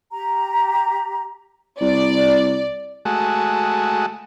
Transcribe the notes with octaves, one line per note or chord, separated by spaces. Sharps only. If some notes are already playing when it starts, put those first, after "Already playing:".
G4 A#5
C2 D5
G#3 A3 F#4